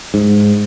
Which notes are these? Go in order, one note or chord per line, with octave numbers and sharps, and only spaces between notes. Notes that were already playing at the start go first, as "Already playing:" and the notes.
G#2